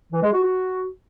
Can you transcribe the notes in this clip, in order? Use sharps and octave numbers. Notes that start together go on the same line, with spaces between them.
E3
G#3
F#4
F#4